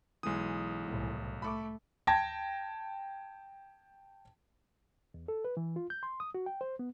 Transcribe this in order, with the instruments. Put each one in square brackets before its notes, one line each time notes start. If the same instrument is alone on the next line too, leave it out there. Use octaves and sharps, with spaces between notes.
[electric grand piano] B1 D#6 [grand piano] E3 G#3
[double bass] C2 A2
[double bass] A3 [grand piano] B5 C#6 D6
[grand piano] G5 A5 G#6 A#6
[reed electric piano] E2
A4
B4
E3
F4
G6
C6
D#6
F#4
G5
C5
B3